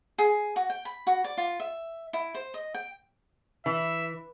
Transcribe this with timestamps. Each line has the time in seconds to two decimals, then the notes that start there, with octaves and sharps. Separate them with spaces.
0.18 G#4
0.56 F#4
0.70 G5
0.85 B5
1.07 F#4
1.24 D5
1.37 F4
1.60 E5
2.13 E4
2.35 C5
2.54 D#5
2.74 G5
3.66 E3 E5